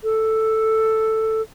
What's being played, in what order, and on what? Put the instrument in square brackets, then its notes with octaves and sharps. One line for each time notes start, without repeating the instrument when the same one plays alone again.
[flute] A4